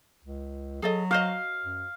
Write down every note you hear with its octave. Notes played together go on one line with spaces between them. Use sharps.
C#2
F#3 G#4 A4 D#5
F#4 C5 D#5 F5
F#2